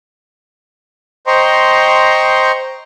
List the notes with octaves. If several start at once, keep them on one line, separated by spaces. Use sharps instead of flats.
C5 D#5 G5 A#5 C6 C#6